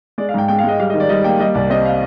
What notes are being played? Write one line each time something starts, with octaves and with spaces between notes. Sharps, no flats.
G#3 D5
F5
G#2 G5
G#3 G5
F5
G#3 D#5
G3 F5
D#5
D#3
D5
G3 D#5
A#3 G5
G3 D#5
C2 D5
C4 D#5
F5